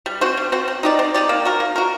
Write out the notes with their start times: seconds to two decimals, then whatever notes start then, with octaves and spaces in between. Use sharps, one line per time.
0.06 G3
0.21 C4 F#4 C5
0.37 G3
0.52 C4 F#4 C5
0.68 C4
0.83 D#4 G4 D5
0.99 C4
1.14 D#4 G4 D5
1.29 A#3
1.45 F#4 A#4
1.60 A#3
1.76 F#4 A#4